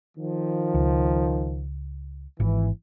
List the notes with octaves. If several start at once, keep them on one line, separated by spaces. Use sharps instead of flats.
D#3 F3
C#2
G#1 E3